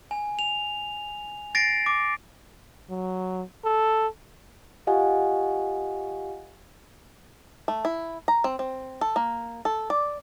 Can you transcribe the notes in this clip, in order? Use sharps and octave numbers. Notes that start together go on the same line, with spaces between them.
G#5
F7
A6 A#6 C7 D7
D6
F#3
A4
F4 G4 D#5 F5 F#5 G#5
A3
E4
A#5
C4
C4
A4
A#3
A4
D5